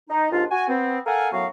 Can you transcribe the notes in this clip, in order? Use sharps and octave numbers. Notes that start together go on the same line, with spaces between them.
D#4
D#2 G#2 D4 F4
F#4 G#5
B3 C4
A4 A#4 F5 F#5 G#5
F#2 A2 F#3 B3 F#4 F5